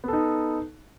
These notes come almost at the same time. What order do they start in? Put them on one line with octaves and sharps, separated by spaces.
B3 A4 D#4